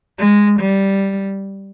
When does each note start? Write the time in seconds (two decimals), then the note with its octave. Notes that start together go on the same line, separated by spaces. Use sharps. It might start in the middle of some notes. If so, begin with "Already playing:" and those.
0.18 G#3
0.60 G3